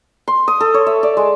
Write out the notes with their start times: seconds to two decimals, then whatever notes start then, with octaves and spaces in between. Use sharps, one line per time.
0.28 C6
0.48 D#6
0.60 A4
0.74 C#5
0.86 E5
1.03 D5
1.17 G#3